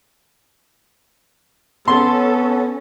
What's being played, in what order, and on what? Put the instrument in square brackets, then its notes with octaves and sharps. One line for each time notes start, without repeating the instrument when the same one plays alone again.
[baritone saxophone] B3 [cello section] C#4 [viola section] A4 [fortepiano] C6